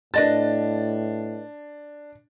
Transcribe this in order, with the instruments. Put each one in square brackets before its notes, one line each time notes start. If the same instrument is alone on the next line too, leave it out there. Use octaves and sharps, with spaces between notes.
[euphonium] A2 [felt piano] D4 A6 [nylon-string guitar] B4 D#5 A5